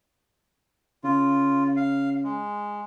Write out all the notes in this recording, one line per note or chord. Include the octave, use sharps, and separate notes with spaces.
C#3 F4
F5
G#3